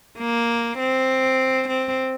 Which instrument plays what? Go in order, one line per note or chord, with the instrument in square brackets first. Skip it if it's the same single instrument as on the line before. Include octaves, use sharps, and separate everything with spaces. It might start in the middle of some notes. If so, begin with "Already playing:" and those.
[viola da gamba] A#3
C4
C4